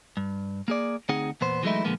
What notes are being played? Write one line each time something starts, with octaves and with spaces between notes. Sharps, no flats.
G2
A#3 G#4 D5
D2 C4 D#4 G#4 F#5
E2 A#2 B3 C5
E3 F#3 G#3 A3 D#4 E4
A#2 D3 F3 G#3 A#3 B3